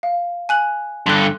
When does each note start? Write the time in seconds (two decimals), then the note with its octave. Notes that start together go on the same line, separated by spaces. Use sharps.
0.03 F5
0.49 G#5 F#6 F#7
1.06 G2 D3 C6 F#6